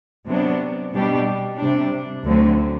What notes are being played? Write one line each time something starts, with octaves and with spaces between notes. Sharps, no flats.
C3 F#3 B3 D4
B2 G3 D4 G4
C3 G3 D4
D2 D3 F#3 C4